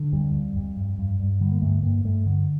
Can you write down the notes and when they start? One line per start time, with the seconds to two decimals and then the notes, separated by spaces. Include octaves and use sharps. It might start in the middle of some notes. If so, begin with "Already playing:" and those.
Already playing: D3
0.12 F2 G3
0.34 F2
0.56 F2
0.77 G2
0.99 G2
1.19 G2
1.40 D3 G3
1.52 A#3
1.62 G2 A3
1.82 G2 A#3
2.05 G2 A3
2.26 D3